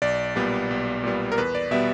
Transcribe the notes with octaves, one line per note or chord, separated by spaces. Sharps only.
B1 D5
A#2 G3 B3
B1
A#2 G3 B3
A#4
E2 B4
D5
B2 G3 B3 E5